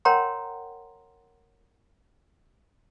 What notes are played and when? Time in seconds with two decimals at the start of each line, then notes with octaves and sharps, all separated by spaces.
0.05 A#4 C#5 F#5 G5 A#5 C6